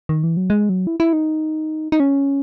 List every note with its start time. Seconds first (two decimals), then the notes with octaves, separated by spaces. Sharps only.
0.09 D#3
0.24 E3
0.37 F#3
0.50 G#3
0.69 F#3
0.87 E4
1.00 E4
1.13 D#4
1.92 D#4
2.00 C#4